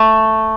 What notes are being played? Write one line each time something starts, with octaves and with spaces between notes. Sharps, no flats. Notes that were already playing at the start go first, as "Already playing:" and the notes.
Already playing: A3